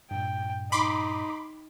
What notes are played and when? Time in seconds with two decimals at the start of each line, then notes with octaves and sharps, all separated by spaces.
0.11 G2 A#2 G5
0.72 D#4 B5 C6 D6